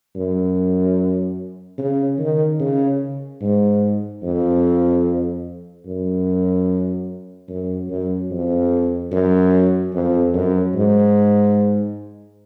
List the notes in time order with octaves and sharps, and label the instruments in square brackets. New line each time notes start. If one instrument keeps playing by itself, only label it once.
[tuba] F#2
C#3
D#3
C#3
G#2
F2
F#2
F#2
F#2
F2
F#2
F2
F#2
G#2